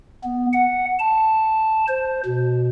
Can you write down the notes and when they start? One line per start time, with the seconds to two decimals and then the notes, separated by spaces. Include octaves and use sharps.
0.24 B3
0.53 F#5
0.99 A5
1.88 C5
2.26 B2